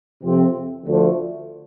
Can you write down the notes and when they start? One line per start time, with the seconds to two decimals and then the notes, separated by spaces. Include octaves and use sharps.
0.23 F2 C3 F3 C4
0.86 D2 D3 F3 A3